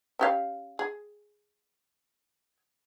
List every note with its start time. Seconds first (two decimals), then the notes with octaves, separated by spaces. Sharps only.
0.19 C#4 G4 F5
0.79 G#4